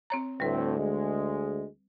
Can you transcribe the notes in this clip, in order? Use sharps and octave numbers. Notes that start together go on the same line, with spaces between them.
C4 C#5 A#5
D2 A2 G3 C4 B4
G#3